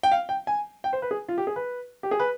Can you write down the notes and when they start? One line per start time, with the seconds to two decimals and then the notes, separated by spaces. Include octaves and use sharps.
0.03 G5
0.12 F5
0.29 G5
0.47 G#5
0.84 G5
0.93 C5
1.02 B4
1.11 G#4
1.28 F4
1.38 G4
1.47 G#4
1.56 B4
2.03 G4
2.11 G#4
2.20 B4